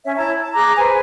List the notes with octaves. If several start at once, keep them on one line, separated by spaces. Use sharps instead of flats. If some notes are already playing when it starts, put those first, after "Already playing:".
C#4 C#5 E5
E4 C#5 A5 A#5
A5
G#4 A#5 D6 F#6
G#4 B4 C5 G#5